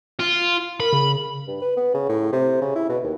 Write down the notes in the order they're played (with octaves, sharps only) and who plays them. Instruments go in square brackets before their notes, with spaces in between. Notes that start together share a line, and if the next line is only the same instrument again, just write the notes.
[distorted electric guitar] F4
[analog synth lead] A#4 [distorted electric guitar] B5
[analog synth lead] C#3
[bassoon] G2
B4
B3
C#3
A2
C3
C#3
E4
B2
D#2